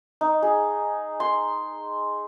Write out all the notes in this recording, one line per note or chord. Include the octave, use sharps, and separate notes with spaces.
D#4
G#4
C6